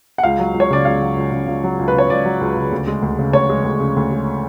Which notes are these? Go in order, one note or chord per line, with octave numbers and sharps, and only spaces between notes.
F#5
C#2 F5
F#3
C#2
C#5
C#3 D5
C#2 F5
F#3
C#2
C#3
C#2
F#3
C#2
B4
C#3 C#5
C#2 D5
F#3
C#2
C#3
D2
G#3
D2
C#3
D2 C#5
G#3
D2
C#3
D2
G#3